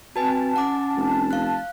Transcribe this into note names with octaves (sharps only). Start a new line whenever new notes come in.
C4 F#4 B4 G#5 A5
C#4 F#5 D6
F1
F5 F#6